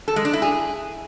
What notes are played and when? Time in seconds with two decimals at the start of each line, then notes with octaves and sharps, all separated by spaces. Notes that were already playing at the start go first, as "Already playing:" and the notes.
0.08 A4
0.16 G#3
0.25 D4
0.33 E4
0.42 G#4